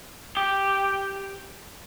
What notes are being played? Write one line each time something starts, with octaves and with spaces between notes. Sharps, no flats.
G4